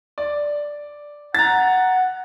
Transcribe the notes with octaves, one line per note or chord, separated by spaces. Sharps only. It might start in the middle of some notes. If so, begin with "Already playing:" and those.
D5
F#5 A#5 A6